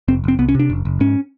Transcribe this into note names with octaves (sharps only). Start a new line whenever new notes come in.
F1 C4
F1 C4
C2 B3
C#4
C3 D4
F#1
F#1
G#2 C#4